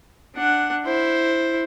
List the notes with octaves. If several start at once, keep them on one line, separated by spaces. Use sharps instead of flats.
D4 F#5
E4 C5